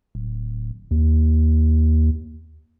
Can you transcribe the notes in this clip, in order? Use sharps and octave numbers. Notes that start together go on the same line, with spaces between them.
D1
D#2